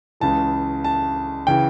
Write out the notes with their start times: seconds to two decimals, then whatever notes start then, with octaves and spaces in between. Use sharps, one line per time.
0.20 C#2 C#3 E3 A5
0.84 A5
1.47 C#3 E3 G5